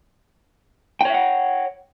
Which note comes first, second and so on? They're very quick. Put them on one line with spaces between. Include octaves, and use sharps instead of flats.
G5 C#5 E5 F#5